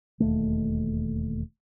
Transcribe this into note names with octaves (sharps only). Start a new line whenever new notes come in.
E1 D#2 A3